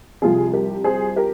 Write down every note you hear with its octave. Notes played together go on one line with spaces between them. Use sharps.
C2 C3 F3 F4 G#4
G4 A#4
G#4 C5
G4 A#4